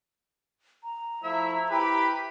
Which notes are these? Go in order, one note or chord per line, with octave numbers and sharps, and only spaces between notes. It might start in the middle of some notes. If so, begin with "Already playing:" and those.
A#5
F3 A3 E4 E5
E4 G4 B4 B5